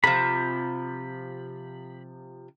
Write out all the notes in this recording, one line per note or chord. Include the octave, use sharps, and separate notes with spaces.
C3 F3 B5